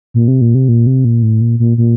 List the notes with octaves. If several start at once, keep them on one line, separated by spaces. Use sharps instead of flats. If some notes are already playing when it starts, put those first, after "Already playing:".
A#2
C3
A#2
C3
A#2
C3
A#2
A2
A#2
A#2
A#2